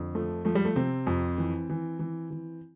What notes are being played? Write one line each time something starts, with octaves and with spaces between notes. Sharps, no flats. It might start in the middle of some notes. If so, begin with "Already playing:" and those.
Already playing: F2 D3
F3 A3
F3 A3
G3
A3
C3 C4
F2
E3
E3
E3
E3